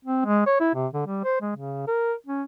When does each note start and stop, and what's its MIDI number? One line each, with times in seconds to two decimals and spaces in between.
0.05 0.24 60
0.25 0.44 56
0.46 0.57 73
0.60 0.70 64
0.74 0.87 48
0.94 1.05 50
1.06 1.23 55
1.24 1.37 72
1.41 1.51 56
1.56 1.84 49
1.87 2.13 70
2.27 2.43 61